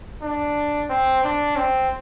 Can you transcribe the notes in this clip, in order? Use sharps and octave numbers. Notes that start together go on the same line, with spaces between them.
D4
C4
D4
C4